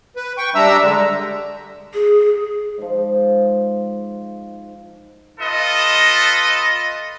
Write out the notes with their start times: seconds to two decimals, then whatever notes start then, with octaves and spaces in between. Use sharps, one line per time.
0.16 B4
0.38 G5 C#6
0.55 G3 D4 E5 A#5 E6
0.82 D3 G#3
1.94 G#4
2.78 G#2 F3
5.40 F4 A4 B4 D#5